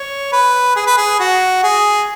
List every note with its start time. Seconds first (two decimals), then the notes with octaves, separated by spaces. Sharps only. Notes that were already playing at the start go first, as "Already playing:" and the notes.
Already playing: C#5
0.32 B4
0.76 G#4
0.87 B4
0.97 G#4
1.20 F#4
1.63 G#4